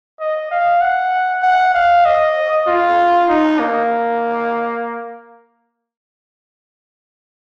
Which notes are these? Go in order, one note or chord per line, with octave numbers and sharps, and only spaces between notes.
D#5
F5
F#5
F#5
F5
D#5
F4
D#4
A#3